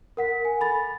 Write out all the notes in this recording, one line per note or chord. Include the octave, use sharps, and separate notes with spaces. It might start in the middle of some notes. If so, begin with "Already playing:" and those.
A#4 F#5 B6
G#5
A4 B5 A6